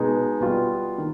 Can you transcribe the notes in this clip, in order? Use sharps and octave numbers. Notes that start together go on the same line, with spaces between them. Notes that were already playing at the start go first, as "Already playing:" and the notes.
Already playing: B2 G#3 B3 D#4 G#4
B2 G3 B3 F4
D#3